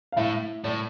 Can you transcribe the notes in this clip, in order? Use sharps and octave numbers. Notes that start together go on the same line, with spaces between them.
F5
A2 E4 E5
A2 D5